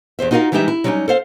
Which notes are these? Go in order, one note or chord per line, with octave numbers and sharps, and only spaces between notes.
E2 G#4 C5 E5
D#4 F4 F#4 G#4 A#4 F5
E3 G3 G#3 D#4 G4 E5
E4
F#3 G3 A3 C4 C#4 D#4
A4 C5 F5